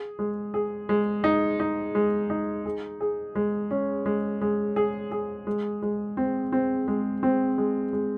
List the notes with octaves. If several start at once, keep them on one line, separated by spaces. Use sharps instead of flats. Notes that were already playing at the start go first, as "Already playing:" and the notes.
Already playing: G#4
G#3
G#4
G#3
D#4
D#4
G#3
D#4
G#4
G#4
G#3
C#4
G#3
G#3
G#4
G#4
G#3
G#3
C4
C4
G#3
C4
G#3
G#3